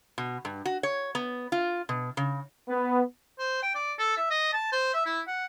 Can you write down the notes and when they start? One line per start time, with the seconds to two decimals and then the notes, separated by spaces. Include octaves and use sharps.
0.18 B2
0.45 G2
0.65 F#4
0.83 C#5
1.15 B3
1.52 F4
1.89 B2
2.17 C#3
2.68 B3
3.39 C5
3.63 G5
3.75 D5
3.99 A4
4.17 E5
4.31 D#5
4.53 A5
4.72 C5
4.94 E5
5.06 E4
5.28 F#5